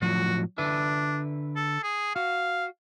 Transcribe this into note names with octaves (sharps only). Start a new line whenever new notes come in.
A2 F3 F#3 F#4
D3 D4 B4 E5
A4
G#4
F#4 F5